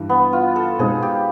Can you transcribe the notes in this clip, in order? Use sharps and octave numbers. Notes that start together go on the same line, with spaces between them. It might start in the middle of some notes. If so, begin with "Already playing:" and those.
Already playing: G2 E3 G3
B3
F4
A4
B2 G#3 C4 D#4 G#4
G4